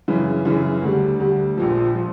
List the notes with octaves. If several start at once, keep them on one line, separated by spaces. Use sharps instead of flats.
F#2 C#3 E3
F#2 C#3 E3
D2 D3 G3
D2 D3 G3
A#1 A#2 F3
A#2 F3